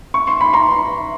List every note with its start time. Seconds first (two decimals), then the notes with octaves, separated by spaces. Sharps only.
0.14 C#6
0.27 C6
0.41 B5
0.53 A#5 C6